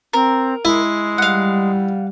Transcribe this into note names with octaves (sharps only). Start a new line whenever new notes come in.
C4 A#4
G#3 E4
G3 F5 F#5